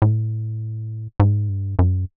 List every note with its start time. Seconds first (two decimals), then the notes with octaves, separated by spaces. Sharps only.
0.02 A2
1.20 G#2
1.49 G2
1.79 F#2